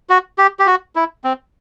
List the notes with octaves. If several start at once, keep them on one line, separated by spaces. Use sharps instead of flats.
F#4
G4
G4
F#4
E4
C4